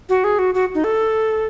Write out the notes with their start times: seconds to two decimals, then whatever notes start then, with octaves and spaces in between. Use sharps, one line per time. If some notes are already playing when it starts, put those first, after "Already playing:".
0.09 F#4
0.24 G#4
0.39 F#4
0.55 F#4
0.75 D#4
0.84 A4